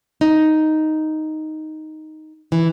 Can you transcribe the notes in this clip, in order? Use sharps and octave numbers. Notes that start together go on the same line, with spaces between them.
D#4
E3